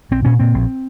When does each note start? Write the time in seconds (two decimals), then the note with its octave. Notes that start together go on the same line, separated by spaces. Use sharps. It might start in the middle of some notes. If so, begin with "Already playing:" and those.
0.11 A#1 C4
0.25 A#2 C#4
0.39 A#2 C4
0.54 A#1